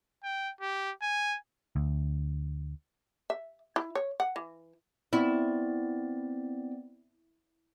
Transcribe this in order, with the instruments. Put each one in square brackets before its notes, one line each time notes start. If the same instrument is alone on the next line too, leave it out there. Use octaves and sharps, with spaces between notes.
[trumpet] G5
G4
G#5
[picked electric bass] D2
[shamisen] E5
E4
C#5
F#5
E3
[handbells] B3 C4 D5 [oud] E4